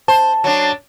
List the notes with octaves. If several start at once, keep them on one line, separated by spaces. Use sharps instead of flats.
C5 A5
F#3 D4